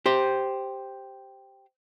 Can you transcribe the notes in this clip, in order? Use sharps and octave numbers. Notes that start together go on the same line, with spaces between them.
G4 C5